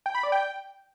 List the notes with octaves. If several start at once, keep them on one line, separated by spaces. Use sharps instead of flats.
G5
B5
D5
G5